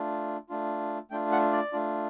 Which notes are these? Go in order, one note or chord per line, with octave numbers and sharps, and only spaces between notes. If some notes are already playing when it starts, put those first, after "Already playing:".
Already playing: A3 D4 F4
A3 D4 F4
A3 D4 F4 G5
F#5
D5
A3 D4 F4